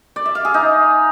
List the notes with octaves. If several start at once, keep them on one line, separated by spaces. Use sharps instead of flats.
D5
E5
F5
G#4
D#4